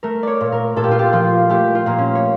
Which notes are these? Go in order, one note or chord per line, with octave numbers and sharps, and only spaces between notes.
A3 A#4
C#5 D5
A#2
A#4
A#2 A4
G4
F4
G4
F3 F4
A3 G4
F4
A#2 A#3
C#4
C#5